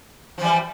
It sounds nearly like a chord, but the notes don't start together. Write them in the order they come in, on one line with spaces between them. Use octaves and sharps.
F3 E3 G3